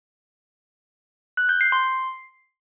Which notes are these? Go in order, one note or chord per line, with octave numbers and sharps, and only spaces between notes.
F#6
G6
C7
C6
C7